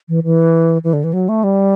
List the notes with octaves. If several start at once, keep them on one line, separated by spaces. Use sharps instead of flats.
E3
E3
E3
D3
E3
F#3
A3
G3